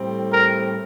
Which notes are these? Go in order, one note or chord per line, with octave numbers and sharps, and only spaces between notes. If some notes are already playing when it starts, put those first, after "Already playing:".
Already playing: A2 G3 C4
A#4